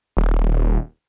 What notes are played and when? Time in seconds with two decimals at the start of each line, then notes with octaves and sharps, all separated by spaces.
0.17 D#1